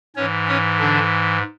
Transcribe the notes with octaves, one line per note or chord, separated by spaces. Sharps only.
G#2 E3 C#4 C#5
C#4 C#5
D3 D4